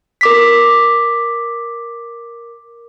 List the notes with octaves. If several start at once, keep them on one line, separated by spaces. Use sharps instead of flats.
A#4 D6 B6